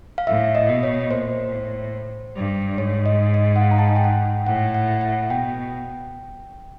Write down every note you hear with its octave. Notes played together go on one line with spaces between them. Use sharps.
F5
A2 E5
D#5
B2
C#5
A#2 C5
A2
G2
G#2 C#5
D#5
D#5
F#5
F5
A#5
A5
G#5
G5
F#5
A2 F#5
F#5
F#5
B2 G5